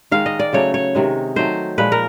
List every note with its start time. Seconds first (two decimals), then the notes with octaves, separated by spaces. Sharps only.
0.11 D#3 G#3 F5
0.26 D#5
0.39 D5
0.53 C#3 F#3 A3 C#5
0.74 C#5
0.95 C3 D#3 G#3
1.36 D#3 F#3 A3 C5
1.78 A#2 F3 G#3 B4
1.92 A#4